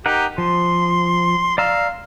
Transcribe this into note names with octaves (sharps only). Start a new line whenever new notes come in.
D#4 G4 A#4 F#5
F3 C6
D5 F5 A#5 E6